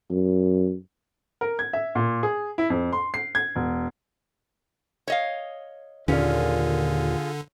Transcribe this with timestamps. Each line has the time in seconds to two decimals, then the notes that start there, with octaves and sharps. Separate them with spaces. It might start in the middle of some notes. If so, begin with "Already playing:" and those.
0.11 F#2
1.41 A#4
1.59 G#6
1.73 E5
1.95 A#2
2.23 G#4
2.58 E4
2.70 F2
2.93 C6
3.14 C7
3.35 G#6
3.56 E1
5.08 C#5 D#5 F5
6.08 D#2 A#2 D3 C#4 F4 G#4